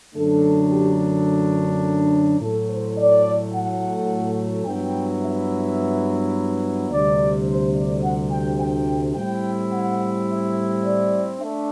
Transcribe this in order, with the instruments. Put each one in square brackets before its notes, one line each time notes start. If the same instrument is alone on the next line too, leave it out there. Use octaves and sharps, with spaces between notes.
[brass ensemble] F#2 D3 F#3 A3 D4 A4
G4
A2 F#3 A3 A4
C5
D5
F#5
G2 F#3 B3 E4 G5
E5
D2 C3 G3 D5
C5
D5
F#5
G5
G5
A2 G3 C4 E4 G5
F#5
E5
D5
A3 D4 E5